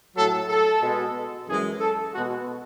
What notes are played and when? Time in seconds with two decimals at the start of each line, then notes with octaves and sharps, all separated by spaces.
0.16 A2 F#3 A4
0.49 A4
0.82 B2 G#3
1.47 F#2 E3 G#3 G#4
1.80 A4
2.12 B2 G#3 F#4